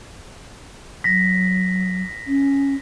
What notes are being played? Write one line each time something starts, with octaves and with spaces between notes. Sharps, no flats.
F#3 A#6 B6
C#4